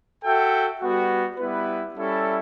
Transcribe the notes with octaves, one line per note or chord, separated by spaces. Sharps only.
F#4 A4 E5 G5
G3 B3 F#4
G3 B3 E4 B4
G3 C#4 E4 A4 E5